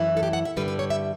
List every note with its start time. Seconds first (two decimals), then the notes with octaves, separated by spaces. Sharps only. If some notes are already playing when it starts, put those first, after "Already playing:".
Already playing: F#2 E3 A3 E4
0.17 A4
0.23 G4
0.33 F#5
0.45 E5
0.56 G2 D3 G3 B4
0.68 B4
0.79 C#5
0.90 E5